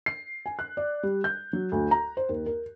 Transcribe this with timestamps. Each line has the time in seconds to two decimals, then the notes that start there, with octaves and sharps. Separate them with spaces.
0.06 C7
0.46 G#5
0.59 F#6
0.77 D5
1.03 G3
1.24 G6
1.53 F#3
1.72 D2
1.91 A#5
2.17 C5
2.29 D#2
2.46 A#4